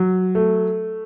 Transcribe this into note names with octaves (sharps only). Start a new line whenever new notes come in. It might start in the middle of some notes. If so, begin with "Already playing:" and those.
Already playing: F#3
A3